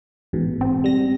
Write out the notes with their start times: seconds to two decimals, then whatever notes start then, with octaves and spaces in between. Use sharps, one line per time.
0.33 A1 G#2 B2
0.61 C4
0.84 G3 A#6